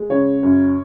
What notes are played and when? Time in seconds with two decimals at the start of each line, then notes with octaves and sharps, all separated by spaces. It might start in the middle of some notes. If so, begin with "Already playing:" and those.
Already playing: G#3
0.10 C#3 C#5
0.43 F#2